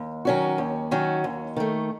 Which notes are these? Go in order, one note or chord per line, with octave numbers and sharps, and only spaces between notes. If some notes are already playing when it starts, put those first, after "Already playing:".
Already playing: D#2
D#3 F#3 C#4 F#4
D#2
D#3 F#3 C#4 F#4
D#2
D#3 A3